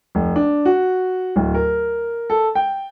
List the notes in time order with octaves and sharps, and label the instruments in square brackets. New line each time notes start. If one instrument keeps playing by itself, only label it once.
[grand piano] F1
D4
F#4
D1
A#4
A4
G5